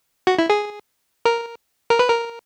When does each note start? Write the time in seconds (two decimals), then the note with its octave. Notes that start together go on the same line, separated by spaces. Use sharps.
0.27 F#4
0.39 E4
0.50 G#4
1.25 A#4
1.90 A#4
1.99 B4
2.09 A#4